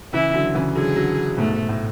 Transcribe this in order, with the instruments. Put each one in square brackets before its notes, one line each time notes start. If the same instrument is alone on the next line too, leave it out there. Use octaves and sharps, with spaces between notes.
[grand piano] C#3 E3 [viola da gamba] E4
[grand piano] D3 F#3
C#3 E3
[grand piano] D3 F#3 [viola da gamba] G#4
[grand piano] D3 F#3
[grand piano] G#2 B2 [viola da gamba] A3
[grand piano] G#2
A2